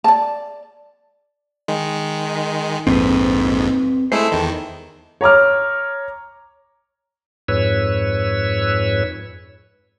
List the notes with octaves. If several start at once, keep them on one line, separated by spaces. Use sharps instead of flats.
D5 A5
D#3 G#3
A#1 F2 G#2 C4 B4
G#3 A3 E4 A4 C5
E2 D#3
C#5 A#5 D6 F6
F2 G#2 B4 C#5 E6